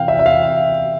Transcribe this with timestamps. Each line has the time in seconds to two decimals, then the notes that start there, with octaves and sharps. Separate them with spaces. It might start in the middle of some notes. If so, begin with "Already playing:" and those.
Already playing: C3 E3 F5 G5
0.08 E5
0.19 E5
0.26 F5